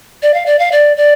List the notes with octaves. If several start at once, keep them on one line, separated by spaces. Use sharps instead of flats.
D5
F5
D5
F5
D5
D5